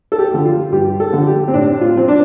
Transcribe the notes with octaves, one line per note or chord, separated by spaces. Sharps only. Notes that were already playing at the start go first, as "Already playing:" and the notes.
A4
G4
D3 F3
F4
G2 G4
A4
D3 F3
G4
C4
A2 D4
F4
F3 C4
D4